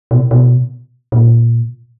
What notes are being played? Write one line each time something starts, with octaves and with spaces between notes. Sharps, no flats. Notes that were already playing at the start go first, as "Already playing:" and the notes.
B2
B2
A#2